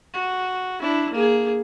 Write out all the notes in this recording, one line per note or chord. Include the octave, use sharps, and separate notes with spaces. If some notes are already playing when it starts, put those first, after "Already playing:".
F#4
D4 E4
A#3 G#4